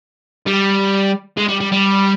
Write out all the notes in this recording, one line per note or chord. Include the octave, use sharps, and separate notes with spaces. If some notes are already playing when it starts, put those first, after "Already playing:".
G3
G#3
G3
G3
G3